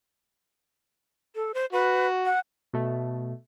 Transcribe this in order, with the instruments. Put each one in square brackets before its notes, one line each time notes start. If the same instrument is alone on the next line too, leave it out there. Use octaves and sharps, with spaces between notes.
[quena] A4
C5
[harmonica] F#4 [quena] B4
[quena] F#5
[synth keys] B2 A3